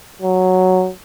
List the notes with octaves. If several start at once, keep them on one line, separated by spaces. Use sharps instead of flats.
F#3